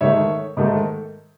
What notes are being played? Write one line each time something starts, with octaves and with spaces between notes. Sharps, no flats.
G#2 D#3 A3 C#5 E5
G#2 D#3 A3